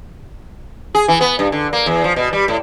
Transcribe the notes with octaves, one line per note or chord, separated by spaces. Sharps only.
G#4
E3
B3
G2
D3
A#3
E2
F3
B2
G3
A2